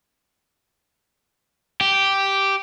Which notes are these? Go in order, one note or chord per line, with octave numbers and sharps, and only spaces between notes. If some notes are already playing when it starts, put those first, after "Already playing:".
G4